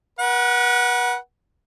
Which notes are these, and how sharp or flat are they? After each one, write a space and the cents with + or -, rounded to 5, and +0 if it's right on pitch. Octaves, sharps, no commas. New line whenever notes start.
B4 -40 F#5 +0